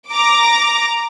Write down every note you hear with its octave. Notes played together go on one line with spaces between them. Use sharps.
A#5 D6